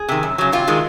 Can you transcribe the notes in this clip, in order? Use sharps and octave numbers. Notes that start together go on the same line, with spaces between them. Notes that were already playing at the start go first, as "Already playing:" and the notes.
Already playing: G#4
C3 D#3
F#2
C#3 F#3
C3 F4
D#3 G#3